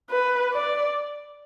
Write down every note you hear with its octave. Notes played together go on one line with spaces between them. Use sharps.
B4
D5